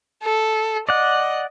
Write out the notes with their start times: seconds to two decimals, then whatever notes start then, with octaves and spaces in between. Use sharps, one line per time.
0.23 A4
0.89 D5 D#5 F#5